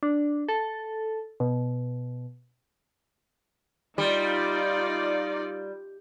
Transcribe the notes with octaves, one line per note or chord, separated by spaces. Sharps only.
D4
A4
B2
G3 D#4 F4 D5